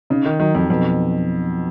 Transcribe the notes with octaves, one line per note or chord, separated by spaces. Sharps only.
C#3 D#4
D#3
D#3 F#3
F2
F2 B2